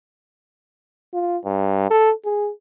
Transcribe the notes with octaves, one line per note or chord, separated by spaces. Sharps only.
F4
G2
A4
G#4